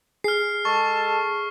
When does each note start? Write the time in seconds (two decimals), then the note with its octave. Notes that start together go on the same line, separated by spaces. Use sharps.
0.24 G#4 F6 C7
0.65 G#3 A4 A5 C#6